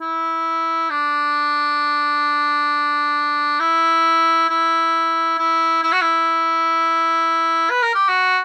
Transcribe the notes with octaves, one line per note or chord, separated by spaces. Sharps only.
E4
D4
E4
E4
E4
E4
F#4
E4
B4
A#4
G4
F#4